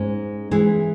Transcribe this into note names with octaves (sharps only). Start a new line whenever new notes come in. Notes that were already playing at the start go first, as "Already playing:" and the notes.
Already playing: G#2 G#3 C#4
E3 G#3 E4 G#4